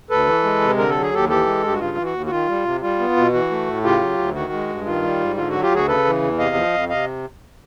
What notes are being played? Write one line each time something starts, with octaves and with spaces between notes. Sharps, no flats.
D2 A4 B4
E3
G#3
C3
D3 A#4
A4
F#3
G#4
D#2 G4 A4
E3 G4 A4
G#3
G2 G4
F#4
C#3 F4
E3
F#4
D#2
F#4
D#3 F4
G3
C3
G3 F4
B3
B2
E3 F#4
A3
A2
C#3 F4 G4
F#3
D2
D#3 F#4
G#3
G2
D#3 F4
G3
G#2
D3 F4
F#3 F#4
F4 G4
D2 F#4 G#4
C#3 A4 B4
E3
E2
C3 D#5 F5
F3
F2
C3 D#5 F5